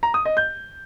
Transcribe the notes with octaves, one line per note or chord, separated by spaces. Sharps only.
A#5
D#6
D#5
G6